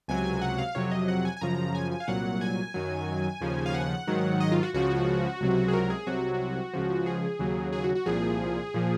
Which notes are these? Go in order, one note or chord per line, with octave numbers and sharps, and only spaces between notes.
C#2 C3 F#3 G#5
F#5
F5
F2 C3 F#3 C#5
D#5
F#5
G#5
G#5
F#2 C#3 F3 A#5
G#5
G#5
F5
C2 A#2 F#3 F#5
G#5
F#2 D#3 F#3
D#2 C#3 F3
F5
F#5
G#2 D#3 F#3
D#5
F4
F#4
C#2 C#3 F3 F#4
C#2 C3 F#3
G#4
A#4
G#4
C2 C3 F#3 F#4
C#2 C#3 F3
G#4
D#2 C#3 F#3
G#4
F#4
F#4
C2 A#2 F3 G#4
A#2 F3